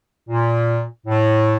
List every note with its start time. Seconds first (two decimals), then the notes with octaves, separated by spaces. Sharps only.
0.29 A#2
1.06 A2